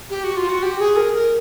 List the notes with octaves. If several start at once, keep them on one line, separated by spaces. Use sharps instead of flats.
G4
F#4
F4
F#4
G4
G#4
A#4
A#4